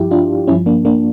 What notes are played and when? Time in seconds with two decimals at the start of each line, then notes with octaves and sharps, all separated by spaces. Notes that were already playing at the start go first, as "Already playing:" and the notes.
Already playing: G2 F3 E4 G4
0.11 D4 F4
0.47 G2 F3 C#4 E4
0.66 A#3 D4
0.85 A#3 D4